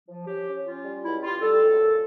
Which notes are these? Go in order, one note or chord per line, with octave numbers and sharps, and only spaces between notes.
F3
C#4 G4
C#4
C#4 F4
G3
C#2 E4
G3 F4
G3 A4
C#2
A#2